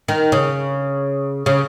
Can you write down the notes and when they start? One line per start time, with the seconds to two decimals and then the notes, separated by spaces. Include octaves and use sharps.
0.08 D#3
0.32 C#3
1.46 C#3